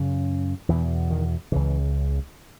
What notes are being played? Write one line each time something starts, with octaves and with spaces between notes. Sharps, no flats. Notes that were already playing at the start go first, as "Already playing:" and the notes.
Already playing: F#2 C#3
E2 B2 E3
D#3
C#2 C#3 E3